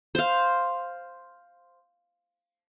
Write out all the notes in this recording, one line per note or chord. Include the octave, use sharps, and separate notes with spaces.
C5 F5